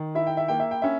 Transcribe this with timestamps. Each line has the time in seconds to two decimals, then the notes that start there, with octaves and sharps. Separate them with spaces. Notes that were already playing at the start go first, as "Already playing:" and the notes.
Already playing: D#3
0.15 E4 E5
0.27 G5
0.37 E5
0.48 A#3 G5
0.60 E5
0.71 G5
0.82 C#4 E5